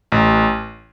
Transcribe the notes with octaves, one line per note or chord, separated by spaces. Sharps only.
A1